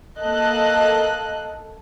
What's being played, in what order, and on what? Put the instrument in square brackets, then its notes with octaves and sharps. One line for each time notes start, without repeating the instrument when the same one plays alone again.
[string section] A#3 A4 D#5 F#6